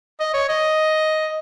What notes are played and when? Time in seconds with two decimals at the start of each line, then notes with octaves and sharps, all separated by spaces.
0.20 D#5
0.34 C#5
0.49 D#5